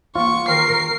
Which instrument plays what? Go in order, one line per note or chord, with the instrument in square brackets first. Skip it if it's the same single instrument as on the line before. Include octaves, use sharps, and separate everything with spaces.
[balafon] E3 A#3 F5 [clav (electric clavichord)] F4 [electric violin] C#6
[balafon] D#3 E3 G5 [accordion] A#4 [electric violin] C7